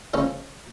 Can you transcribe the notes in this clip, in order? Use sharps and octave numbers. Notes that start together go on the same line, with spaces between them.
C#2 C#3 F3 C#4